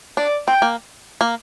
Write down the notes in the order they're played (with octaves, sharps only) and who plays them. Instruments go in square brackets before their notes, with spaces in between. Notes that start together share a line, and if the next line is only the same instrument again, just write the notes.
[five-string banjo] D4 [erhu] D5
[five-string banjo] C4 [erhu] G5
[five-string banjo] A#3
A#3